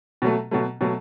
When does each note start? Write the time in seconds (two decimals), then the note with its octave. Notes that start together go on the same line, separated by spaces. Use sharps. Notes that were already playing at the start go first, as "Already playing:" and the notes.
0.22 B2 F#3 A3
0.51 B2 F#3 A3
0.81 B2 F#3 A3